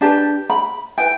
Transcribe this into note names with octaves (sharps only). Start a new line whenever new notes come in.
D4 G4 B4 A5
B5
E4 B4 G5